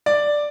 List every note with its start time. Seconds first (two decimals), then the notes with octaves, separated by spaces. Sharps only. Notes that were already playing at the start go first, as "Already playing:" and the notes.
0.06 D5